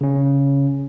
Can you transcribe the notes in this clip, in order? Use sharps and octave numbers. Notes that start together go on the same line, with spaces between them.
C#3 C#4